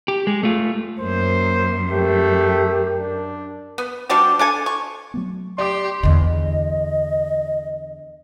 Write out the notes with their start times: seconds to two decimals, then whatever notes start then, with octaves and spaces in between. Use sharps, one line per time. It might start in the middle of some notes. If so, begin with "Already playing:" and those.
0.08 G4
0.27 G#3
0.43 A3 F4
1.00 F#2 A#3 C5
1.90 A3 G4 A#4
2.97 D4
3.78 B3
4.09 G3 D4 F#4 G4
4.39 D4 A4 G#5
4.66 C#6
5.14 F#3 A3 B3
5.58 G4 D5 C6 D6
6.03 E2 D3 D#5